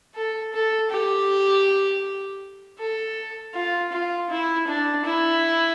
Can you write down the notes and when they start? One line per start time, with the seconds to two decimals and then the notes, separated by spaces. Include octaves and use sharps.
0.15 A4
0.53 A4
0.91 G4
2.79 A4
3.54 F4
3.92 F4
4.30 E4
4.68 D4
5.05 E4